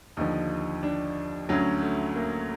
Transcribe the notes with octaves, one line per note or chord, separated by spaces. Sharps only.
D#2 D3 F3 D#4
D4
D2 D3 F#3 C#4
A3
A#3